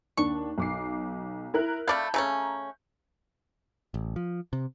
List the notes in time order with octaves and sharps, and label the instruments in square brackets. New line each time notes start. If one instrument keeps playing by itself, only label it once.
[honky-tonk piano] D#2 D4 [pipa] C#6
[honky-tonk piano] B1 D6 C7
E4 A#4 F#6
[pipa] A3 D5 F5 [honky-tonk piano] A5 B5 G6
[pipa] C#3 A3 C#4 [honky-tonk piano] A#5
[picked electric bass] A1
F3
C3